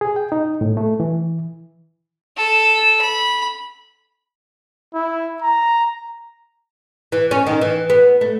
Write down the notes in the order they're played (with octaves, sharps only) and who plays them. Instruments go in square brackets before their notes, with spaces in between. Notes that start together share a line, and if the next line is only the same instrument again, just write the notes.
[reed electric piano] G#4
G5
D#4
A2
A3
E3
[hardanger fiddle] A4
B5
[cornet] E4
A#5
[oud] E3
C#4
D#3
E3
B3
A3